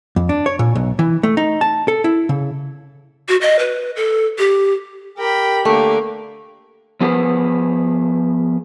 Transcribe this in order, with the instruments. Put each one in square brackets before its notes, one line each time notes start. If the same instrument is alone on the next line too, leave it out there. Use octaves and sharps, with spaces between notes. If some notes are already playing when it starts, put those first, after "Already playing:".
[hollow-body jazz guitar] F2
D4
C#5
A#2
B1
E3
A3
D#4
A5
A4
E4
C#3
[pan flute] F#4
D#5
B4
A4
G4
[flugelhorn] G4 [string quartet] A#4 G5 B5
[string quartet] D3 A#3 [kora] A3
[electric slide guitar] F3 B3 G#4 A#4 B4